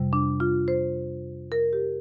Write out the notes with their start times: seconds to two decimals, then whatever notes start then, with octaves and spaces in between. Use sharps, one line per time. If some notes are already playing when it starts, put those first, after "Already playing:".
Already playing: F2 C3 G3
0.13 D4
0.40 F4
0.68 C5
1.52 A#4
1.73 G4